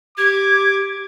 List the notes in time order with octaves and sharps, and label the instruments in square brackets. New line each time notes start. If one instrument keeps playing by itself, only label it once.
[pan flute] G4 [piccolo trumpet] D6 [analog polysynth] G#6